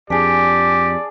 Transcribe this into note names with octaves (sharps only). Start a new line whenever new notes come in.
F2 D4 G4 G#4 D5